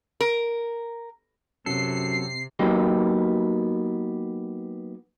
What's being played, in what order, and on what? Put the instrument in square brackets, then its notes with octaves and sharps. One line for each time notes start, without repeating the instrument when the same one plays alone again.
[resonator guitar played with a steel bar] A#4
[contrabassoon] F#2 [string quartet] C3 [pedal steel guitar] F#3 A4 [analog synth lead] C7
[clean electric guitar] F#3 A#3 B3 D#4 G4